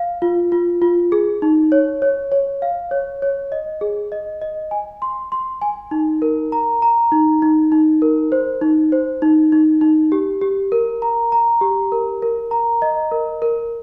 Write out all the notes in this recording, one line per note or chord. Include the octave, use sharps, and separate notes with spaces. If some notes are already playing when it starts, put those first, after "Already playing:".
Already playing: F5
F4
F4
F4
G#4
D#4
C#5
C#5
C#5
F5
C#5
C#5
D#5
G#4
D#5
D#5
G#5
C6
C6
G#5
D#4
A#4
A#5
A#5
D#4
D#4
D#4
A#4
C5
D#4
C5
D#4
D#4
D#4
G4
G4
A#4
A#5
A#5
G4
A#4
A#4
A#5
D#5
A#4
A#4